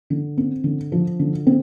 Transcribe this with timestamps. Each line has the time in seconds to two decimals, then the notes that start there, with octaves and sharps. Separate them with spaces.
0.10 D3
0.37 C4
0.64 D3
0.92 F3
1.19 D3
1.47 C4